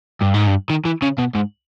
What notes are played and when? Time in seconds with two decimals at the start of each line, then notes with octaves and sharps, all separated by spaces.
0.21 G2
0.34 G#2
0.47 G2
0.70 D#3
0.85 E3
1.02 C#3
1.18 B2
1.35 G#2